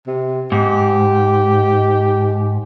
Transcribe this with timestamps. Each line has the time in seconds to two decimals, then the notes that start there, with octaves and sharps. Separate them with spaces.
0.07 C3
0.52 G#2 G4